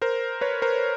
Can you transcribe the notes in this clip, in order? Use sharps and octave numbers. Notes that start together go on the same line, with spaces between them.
A#4 C5
B4 C#5
A#4 C5